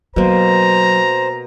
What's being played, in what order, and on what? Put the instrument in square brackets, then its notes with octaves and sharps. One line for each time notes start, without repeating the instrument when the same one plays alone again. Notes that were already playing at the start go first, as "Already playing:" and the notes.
[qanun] B2 A#3 [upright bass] F#3 [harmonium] C5 [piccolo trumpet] A#5